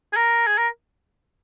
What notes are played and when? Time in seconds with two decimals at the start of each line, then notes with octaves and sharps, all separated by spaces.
0.13 G#4
0.16 A#4
0.47 G#4
0.58 A#4